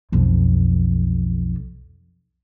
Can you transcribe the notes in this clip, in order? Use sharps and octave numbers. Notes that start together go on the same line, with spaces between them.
B1 F2